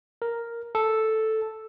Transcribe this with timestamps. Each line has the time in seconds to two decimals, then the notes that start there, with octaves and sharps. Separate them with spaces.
0.22 A#4
0.75 A4